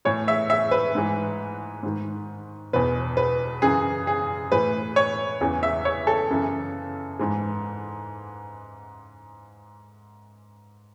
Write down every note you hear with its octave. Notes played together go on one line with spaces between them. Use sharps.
A2 E3 C#5
E5
E5
B4
G#2 E3
G#2 D#3
E2 B2 B4
B4
F#2 C#3 E3 G#4
G#4
A2 E3 B4
C#5
E2 C#3 E3
E5
C#5
A4
F#2 C#3 E3
G#2 E3